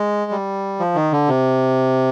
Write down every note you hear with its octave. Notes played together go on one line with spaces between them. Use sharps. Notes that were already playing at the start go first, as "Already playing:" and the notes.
Already playing: G#3
G3
F3
D#3
D3
C3